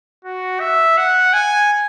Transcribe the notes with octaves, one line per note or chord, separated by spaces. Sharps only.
F#4
E5
F#5
G#5